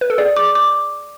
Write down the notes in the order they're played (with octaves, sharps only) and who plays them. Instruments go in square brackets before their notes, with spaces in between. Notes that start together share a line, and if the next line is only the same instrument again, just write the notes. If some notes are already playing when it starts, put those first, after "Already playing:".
[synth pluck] B4
A4
[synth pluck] G#4 [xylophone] D5
[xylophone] D6
D6